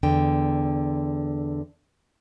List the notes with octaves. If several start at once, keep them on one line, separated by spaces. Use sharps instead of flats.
E2 D3 G5